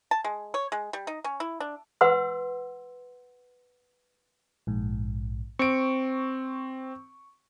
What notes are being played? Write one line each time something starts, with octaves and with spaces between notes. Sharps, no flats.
A5
G#3
C#5
G#3
G3
D#4
C#4
E4
D4
B4 F#5 C6 E6
A#1 G#2
C4 C#6 D7